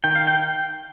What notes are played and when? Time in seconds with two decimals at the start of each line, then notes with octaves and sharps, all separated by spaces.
0.04 D#3 G5
0.15 F5
0.27 G5